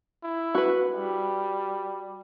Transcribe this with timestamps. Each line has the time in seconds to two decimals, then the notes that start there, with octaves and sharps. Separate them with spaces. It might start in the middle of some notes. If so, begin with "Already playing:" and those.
0.24 E4
0.55 F#4 B4
0.92 G3